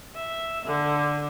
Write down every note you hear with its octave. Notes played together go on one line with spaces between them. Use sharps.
E5
D3